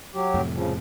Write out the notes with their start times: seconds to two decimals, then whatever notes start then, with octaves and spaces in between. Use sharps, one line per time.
0.14 F#3 G4
0.34 F2 A2 C3
0.54 C#3 F3